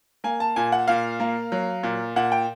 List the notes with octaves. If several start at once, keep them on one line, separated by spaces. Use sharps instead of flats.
A#3 G#5
A5
A#2 G#5
F#5
A#2 F5
A#3
F#3
A#2
A#2 F#5
G5